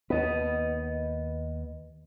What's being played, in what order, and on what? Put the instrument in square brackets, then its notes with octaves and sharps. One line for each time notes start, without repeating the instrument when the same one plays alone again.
[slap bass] D#2 B3 [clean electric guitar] B4 D#5